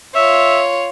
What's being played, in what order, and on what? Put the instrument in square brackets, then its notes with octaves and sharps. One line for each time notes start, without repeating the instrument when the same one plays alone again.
[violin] F4 C#5 [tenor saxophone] E5